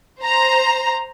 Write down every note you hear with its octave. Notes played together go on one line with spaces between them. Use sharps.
C5 A#5